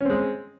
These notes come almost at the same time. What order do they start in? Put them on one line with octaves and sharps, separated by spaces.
C#4 C4 G#3